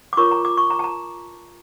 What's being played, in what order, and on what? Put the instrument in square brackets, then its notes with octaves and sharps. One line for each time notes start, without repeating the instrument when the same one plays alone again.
[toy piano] D6
F4 A#4 C#5 C#6
A#5
D6
C#6
A#5
A5
A#5